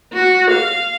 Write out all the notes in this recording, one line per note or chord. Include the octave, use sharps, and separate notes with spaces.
F#4
F5